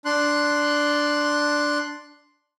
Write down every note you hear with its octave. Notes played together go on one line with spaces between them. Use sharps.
D4 C6 F#6